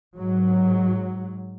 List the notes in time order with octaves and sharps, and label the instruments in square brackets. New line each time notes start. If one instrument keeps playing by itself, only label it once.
[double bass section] G#2 F#3